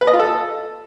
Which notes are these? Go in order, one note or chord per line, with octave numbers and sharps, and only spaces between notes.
B4
D#5
F4
A4